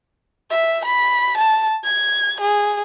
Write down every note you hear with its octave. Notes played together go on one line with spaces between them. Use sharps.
E5
B5
A5
G#6
G#4